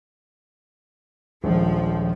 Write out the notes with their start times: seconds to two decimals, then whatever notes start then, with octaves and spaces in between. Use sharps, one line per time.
1.44 D#1 A#1 F3 G#3